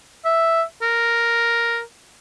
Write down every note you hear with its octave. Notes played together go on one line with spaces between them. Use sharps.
E5
A#4